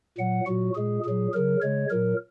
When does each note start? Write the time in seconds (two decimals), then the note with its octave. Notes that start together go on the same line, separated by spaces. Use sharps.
0.18 A#2 F#3 F#5
0.46 A#2 F#3 F#4
0.75 A#2 G#3 G#4
1.05 A#2 F#3 G#4
1.33 C#3 F#3 A#4
1.62 C#3 G#3 C#5
1.90 A#2 F#3 A#4